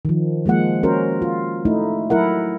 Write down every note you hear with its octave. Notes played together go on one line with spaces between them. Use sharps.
D#3 F3
F3 G#3 A#3 F#5
C#4 F#4 A#4 C5
F4
A3 D#4 E4
F#3 E4 A#4 F#5